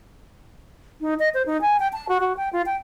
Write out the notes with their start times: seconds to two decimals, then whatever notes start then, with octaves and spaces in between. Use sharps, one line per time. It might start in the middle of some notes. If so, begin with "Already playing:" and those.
1.01 D#4
1.19 D#5
1.34 C5
1.46 D#4
1.61 G#5
1.80 G5
1.93 A5
2.09 F#4
2.20 F#4
2.37 G5
2.53 F4
2.66 G5